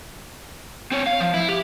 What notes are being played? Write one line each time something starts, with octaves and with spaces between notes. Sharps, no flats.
C4 C#5
F5
F3
E4
G4